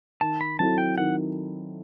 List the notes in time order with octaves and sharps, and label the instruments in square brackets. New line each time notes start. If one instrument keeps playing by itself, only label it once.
[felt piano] D#3 [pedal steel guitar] A5
[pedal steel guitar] B5
[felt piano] F#3 C4 E4 A4 [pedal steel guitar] A5
[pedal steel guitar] G5
[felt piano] D#3 [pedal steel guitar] F#5